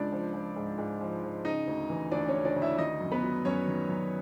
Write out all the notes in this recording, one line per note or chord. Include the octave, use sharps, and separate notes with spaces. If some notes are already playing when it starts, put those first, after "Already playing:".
Already playing: C#2 C#3 D4 D5
F3
F3
G#2
G#2
F3
F3
C#3 D#4 D#5
D2
E3
D2 D4 D5
C#4 C#5
C#3
D4 D5
D2
E4 E5
D#3 D#4 D#5
F#2
B3 B4
F#3
F#2 C#4 C#5
D#3
F#2